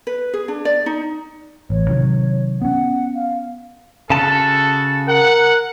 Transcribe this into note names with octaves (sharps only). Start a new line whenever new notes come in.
B4
G#4
D4
D5
D#4
A1 C#5
C3 D#3 F#3
B3 C#4 F#5
F5
C#3 F#4 A4 A5
A#4 F#5